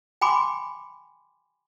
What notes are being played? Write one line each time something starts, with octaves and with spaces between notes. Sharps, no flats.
G5 G#5 B5 C6 D6